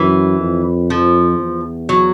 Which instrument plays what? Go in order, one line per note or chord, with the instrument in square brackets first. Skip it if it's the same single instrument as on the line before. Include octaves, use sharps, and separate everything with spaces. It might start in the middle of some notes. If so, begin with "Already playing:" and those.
Already playing: [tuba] F#2 [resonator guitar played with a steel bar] E3
[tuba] F2
[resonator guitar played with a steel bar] F3
[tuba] E2
[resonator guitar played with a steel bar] F#3